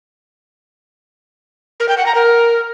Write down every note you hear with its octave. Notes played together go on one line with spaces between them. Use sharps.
A#4
G5
F#5
A#5
A#4